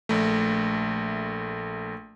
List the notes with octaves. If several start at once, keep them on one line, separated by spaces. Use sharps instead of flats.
A#1 A3